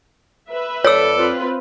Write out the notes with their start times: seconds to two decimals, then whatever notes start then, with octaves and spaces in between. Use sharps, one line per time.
0.51 B4 E5
0.85 F2 A4 C#5 D5 E6
1.16 C4 F4 B4